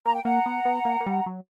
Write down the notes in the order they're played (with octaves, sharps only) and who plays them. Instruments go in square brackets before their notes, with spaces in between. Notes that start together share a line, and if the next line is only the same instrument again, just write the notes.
[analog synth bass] A#3 [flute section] A#5
[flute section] G5
[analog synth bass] A#3 [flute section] F#5 A#5
[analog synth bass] B3
B3
A#3
A#3
G3
F#3